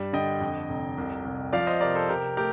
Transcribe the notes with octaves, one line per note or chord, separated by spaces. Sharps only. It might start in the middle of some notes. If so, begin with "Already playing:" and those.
Already playing: G2 G3
D3 D#5 G5
F2
F1
C2
C2
F3 D5 F5
C5 D#5
C3 A#4 D5
A4 C5
C3 G4 A#4
A3 G4 A#4